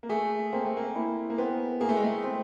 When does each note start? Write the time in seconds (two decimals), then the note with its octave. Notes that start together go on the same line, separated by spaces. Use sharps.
0.03 A#3
0.09 A3 G#4
0.53 A#3 C4
0.65 A3
0.77 A#3
0.95 A#3 E4
1.30 A#3
1.38 B3 C4
1.80 A#3 G#4
1.89 A3
1.96 G#3
2.04 A3
2.24 C4